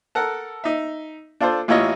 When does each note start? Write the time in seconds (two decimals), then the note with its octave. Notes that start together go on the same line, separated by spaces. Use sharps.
0.15 A4 A#4 F#5
0.64 D#4 E5
1.41 D4 F4 A4 C5
1.68 A1 E4 F4 C#5 D#5